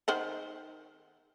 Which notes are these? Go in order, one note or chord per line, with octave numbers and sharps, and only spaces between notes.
D#3 C5 F#5